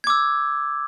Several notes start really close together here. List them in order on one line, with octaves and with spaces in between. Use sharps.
G#6 D6 E6